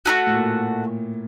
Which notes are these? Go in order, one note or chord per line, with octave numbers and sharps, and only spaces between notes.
A3 D#4 F#4
A2
A#2